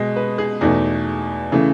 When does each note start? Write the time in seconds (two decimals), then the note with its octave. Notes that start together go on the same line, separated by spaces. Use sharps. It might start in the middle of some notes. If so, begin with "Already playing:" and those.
Already playing: B2 G#3 D#5
0.16 B4
0.38 G#4
0.61 E2 B2 A3 D#4
1.52 C#3 E3 A3